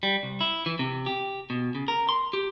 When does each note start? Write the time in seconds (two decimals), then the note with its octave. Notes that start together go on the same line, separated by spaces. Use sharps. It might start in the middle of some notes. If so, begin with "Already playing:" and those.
0.03 G3
0.23 C2
0.41 E4
0.66 E3
0.79 C3
1.06 G4
1.50 B2
1.75 C#3
1.88 A#4
2.09 C6
2.33 G4